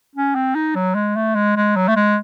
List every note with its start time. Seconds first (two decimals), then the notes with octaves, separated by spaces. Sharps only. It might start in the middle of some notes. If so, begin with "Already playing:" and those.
0.16 C#4
0.35 C4
0.55 D#4
0.75 F#3
0.95 G#3
1.16 A3
1.35 G#3
1.56 G#3
1.76 F#3
1.88 A3
1.96 G#3